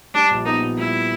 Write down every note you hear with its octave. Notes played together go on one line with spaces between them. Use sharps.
G3 D4
A#1
B3 D#4
A#2
G3 E4